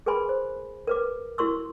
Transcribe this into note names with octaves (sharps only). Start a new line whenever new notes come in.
G#4 A#4 B4 G#5 B5 C6
C5
A#4 B4 D6
E4 F#4 A#4 C6 C#6 E6